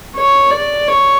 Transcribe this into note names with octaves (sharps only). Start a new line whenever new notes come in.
C#5
D5
C#5